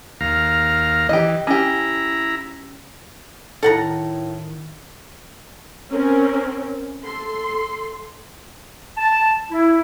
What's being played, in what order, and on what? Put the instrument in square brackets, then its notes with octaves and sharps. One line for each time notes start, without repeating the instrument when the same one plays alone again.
[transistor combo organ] D#2 F5 A#5
[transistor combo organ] E3 [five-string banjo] G4 D#5
[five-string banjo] C#4 G4 [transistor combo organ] E4 A#5
[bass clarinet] A2 [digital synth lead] D#3 [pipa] A4 F#5 A#5
[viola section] C4 C#4 A#4
A4 C6
[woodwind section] A5
E4